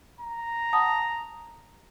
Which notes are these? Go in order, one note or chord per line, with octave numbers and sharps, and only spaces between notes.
A#5
F#5 A5 D#6